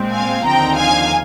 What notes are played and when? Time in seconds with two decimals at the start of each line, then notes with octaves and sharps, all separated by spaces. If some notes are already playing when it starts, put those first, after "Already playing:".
Already playing: A#2 G#3 C4
0.13 F5 G#5
0.45 D#2 D3 F3 C4 D#4 G5 A#5
0.77 F5 G#5